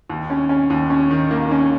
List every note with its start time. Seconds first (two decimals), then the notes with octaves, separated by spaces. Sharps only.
0.10 D#2
0.30 C#4
0.49 C#4
0.70 D#2
0.90 C#4
1.11 D#3
1.31 A#3
1.51 C#4